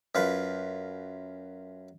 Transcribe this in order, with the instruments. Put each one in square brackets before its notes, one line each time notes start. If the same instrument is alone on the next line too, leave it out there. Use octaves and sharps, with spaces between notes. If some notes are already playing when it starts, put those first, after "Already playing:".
[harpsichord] F#2 F4 B4